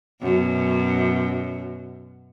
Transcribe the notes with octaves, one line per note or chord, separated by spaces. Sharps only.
F#2 B2